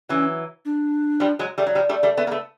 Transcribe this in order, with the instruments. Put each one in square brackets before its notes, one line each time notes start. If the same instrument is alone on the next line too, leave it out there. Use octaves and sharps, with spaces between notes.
[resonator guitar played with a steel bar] E3 F#3 [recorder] C#4
[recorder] D4
[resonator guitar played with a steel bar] F3 G3
F#3 G#3
G3 A3
F#3
F3 G3
G3 A3
G3 A3
A3 B3
A#3
A3 B3